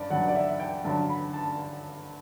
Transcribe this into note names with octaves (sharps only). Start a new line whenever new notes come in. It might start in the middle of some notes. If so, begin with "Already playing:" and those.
Already playing: G2 D5
G2 F#3 F#5
D5
E5
G5
G2 D3 F#3 A5
B5
A5